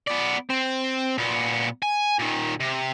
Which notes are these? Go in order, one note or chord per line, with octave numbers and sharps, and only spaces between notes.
B3 D5
C4
A#2 B3
G#5
A#2 D#3
C3